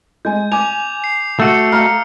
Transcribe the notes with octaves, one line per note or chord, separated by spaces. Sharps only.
G#3 G#5 G6
G#5 D6 F7
C7
A3 F#4 E6 C#7
F5 A#5 F6 C#7